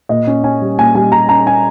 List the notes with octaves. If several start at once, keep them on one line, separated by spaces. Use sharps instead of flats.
A#2 D#5
C#4
C#4 G#5
G3
A#2 G#5
G3 G#5
G3 A#5
C#4 A#5
C#4 G#5